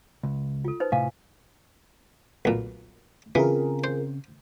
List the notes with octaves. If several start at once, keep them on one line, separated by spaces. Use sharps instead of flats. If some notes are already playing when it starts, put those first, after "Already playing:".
C#2
F4 A4
D#4 B4 C5
A2 C3 F5 G#5
B1 A#2
C#3 E3 C4 C#4 F4 G#4 A#4
C5